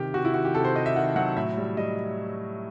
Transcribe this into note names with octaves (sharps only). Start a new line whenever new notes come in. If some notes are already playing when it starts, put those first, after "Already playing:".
Already playing: C3 D#3 G4
C3 F#4
E4
D#3 F#4
G4
C3 A4
C5
C3 D#5
E5
D#3 F#5
F#3 F#5
A2 E5
G3
G3 D#5